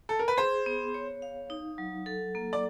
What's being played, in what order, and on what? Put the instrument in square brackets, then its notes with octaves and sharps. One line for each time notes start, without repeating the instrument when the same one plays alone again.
[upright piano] A4
A#4
B4
[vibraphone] G#4 [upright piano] C5
[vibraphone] B3
C#5
F5
D#4
F#3
A4
A#3
[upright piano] D5